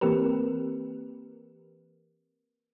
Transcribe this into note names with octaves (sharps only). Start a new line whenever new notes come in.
E3 A#3 C4 G4 A#4 B4